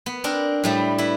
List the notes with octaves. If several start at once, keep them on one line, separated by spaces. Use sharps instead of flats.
B3
C4 D4 A#4
A2 G3 A3
E4 B4